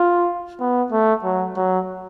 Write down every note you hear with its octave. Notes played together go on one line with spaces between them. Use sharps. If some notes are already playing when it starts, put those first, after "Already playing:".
Already playing: F4
B3
A3
F#3
F#3